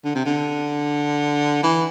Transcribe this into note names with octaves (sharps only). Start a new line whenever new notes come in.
D3
C3
D3
E3